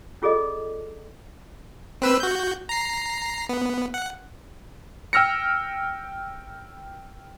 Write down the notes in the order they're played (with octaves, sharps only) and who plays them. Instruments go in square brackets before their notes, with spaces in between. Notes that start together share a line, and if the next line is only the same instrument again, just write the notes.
[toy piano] C#4 F4 G#4 A4 D5 D#5
[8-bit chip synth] C4 B4 E6
F#4 G6
A#5 C7
B3
F#5
[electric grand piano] G5 E6 F6 A#6 C#7